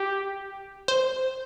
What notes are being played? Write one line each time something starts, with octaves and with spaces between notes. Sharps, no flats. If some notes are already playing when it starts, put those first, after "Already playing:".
Already playing: G4
C5